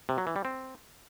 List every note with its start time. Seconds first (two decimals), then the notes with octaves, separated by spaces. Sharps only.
0.09 C3
0.18 F#3
0.27 E3
0.36 G3
0.45 C4